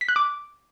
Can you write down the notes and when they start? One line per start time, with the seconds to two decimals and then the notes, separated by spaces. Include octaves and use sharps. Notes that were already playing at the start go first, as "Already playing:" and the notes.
0.01 B6
0.09 F#6
0.16 D6